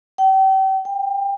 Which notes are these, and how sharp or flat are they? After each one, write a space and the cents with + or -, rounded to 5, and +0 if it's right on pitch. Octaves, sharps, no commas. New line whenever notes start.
G5 -35
G5 +25